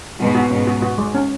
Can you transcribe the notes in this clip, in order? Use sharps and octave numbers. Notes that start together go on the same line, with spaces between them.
G#2 B2 F#4
F#4
G#2 B2 C#4
F#4
F#4
G#3
C#4